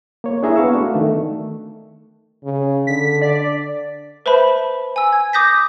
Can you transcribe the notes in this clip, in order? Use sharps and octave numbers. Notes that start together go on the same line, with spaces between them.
A#3 C#5
D4 E4 G#4 E5 A#5
B3 F5 C#6 E6
A3 D4 F#4
D#3 A3
C#3
D3 B6
D5
B4 C5 E5 A5 B5
G#5 E6
G#6
D6 D#6 G6 A#6 B6